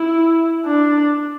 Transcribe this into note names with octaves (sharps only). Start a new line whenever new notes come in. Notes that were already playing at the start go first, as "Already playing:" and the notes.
Already playing: E4
D4